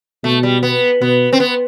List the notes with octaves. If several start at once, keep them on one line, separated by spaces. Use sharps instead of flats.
B2 A3
G3
B3
B2 B3
C4
B3